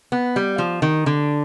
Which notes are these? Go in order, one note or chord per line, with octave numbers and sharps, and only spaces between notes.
B3
G3
F3
D#3
D3